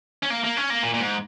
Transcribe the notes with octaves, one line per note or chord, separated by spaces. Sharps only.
C#4
A#3
A#3
C#4
A#3
A#2
A#2
G#2